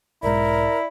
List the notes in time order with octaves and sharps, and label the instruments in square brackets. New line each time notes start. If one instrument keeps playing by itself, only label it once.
[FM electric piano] B1 G#2 [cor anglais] E4 [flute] A#4 [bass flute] D5